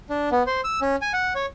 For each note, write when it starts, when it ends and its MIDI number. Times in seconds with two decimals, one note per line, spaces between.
0.10 0.29 62
0.32 0.43 59
0.47 0.61 72
0.64 0.80 88
0.81 0.96 61
1.02 1.12 80
1.13 1.34 78
1.35 1.46 73